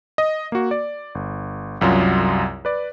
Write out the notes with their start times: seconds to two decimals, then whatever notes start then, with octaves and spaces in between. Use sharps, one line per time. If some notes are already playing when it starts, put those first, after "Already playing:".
0.18 D#5
0.52 A#3 F#4
0.71 D5
1.15 G1
1.81 C2 F#2 F#3 F4
2.65 B4 D5